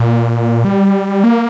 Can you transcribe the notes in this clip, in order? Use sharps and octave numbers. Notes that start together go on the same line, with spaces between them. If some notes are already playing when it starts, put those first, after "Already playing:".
Already playing: A#2
G3
A#3